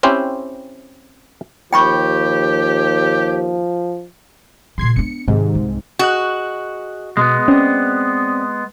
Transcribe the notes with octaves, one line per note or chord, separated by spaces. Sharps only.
C4 C#4 E4 G4 C5
D#2 F3 G4 G5 B5 C#6
A#2 C#3 C6 G#6 C7
B3 D4 C#7
G#2 C3 D#3
C2
F#4 G#4 D#5 F#6
B2 G#3 B3
C4 C#4 D5